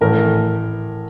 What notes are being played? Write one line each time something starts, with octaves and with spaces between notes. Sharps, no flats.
A1 A2 A3 A#4